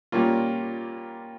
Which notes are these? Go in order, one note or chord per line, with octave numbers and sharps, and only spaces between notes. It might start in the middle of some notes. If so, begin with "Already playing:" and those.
A#2 G3 A#3 C#4 F4